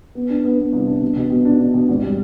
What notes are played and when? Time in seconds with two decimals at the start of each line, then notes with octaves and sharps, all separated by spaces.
0.15 B3
0.30 D4
0.45 B3
0.59 B3
0.73 C2
0.88 D4
1.01 B2
1.17 B2
1.30 B2
1.45 D4
1.59 D4
1.74 B2
1.89 G#1
2.03 G3